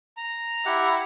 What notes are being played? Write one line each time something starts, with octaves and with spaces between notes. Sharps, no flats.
A#5
E4 G4 F#5